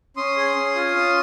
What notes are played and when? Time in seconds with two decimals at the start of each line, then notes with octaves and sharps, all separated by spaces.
0.17 C#4 C6 D#6
0.37 G#4
0.57 C#4
0.76 F4
0.96 C#4